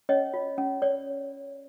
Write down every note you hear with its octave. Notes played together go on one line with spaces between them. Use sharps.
C#4 C#5 D#5
F4
C#4
C#5 D5